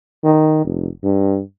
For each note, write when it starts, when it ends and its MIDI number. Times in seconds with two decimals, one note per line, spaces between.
0.24 0.64 51
0.65 0.88 29
1.04 1.41 43